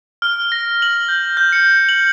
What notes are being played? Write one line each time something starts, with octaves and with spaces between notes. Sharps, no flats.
F6
A#6
F#7
G6
G6
C#7
F#7